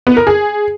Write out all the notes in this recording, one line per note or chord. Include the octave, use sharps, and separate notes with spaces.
B3
A#4
G#4